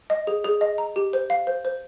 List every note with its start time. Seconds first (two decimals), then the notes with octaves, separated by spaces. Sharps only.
0.10 D#5
0.27 G#4
0.44 G#4
0.61 D#5
0.78 A#5
0.96 G4
1.13 C5
1.30 F5
1.47 C5
1.65 C5